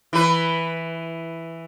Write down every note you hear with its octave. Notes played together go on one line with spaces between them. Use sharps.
E3 B4